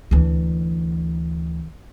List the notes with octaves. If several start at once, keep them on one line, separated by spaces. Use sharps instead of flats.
D2 E3